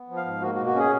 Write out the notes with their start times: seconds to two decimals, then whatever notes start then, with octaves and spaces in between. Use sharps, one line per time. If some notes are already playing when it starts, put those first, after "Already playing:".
Already playing: B3
0.08 F3
0.17 F5
0.25 G#2
0.41 A#3 F#4
0.55 F#4
0.58 B2
0.66 F#4
0.75 C#4 G#4